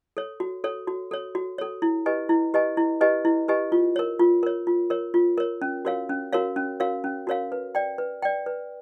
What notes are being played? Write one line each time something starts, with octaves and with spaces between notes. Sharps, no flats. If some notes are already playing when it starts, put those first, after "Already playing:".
A4 C#5
F#4
A4 C#5
F#4
A4 C#5
F#4
A4 C#5
E4
G4 B4 D#5 G#5
E4
G4 B4 D#5 G#5
E4
G4 B4 D#5 G#5
E4
G4 B4 D#5 G#5
F4
A#4 C#5
F4
A#4 C#5
F4
A#4 C#5
F4
A#4 C#5
C#4
F#4 A#4 C#5 F5
C#4
F#4 A#4 C#5 F5
C#4
F#4 A#4 C#5 F5
C#4
F#4 A#4 C#5 F5
B4
D5 G5
B4
D5 G5
B4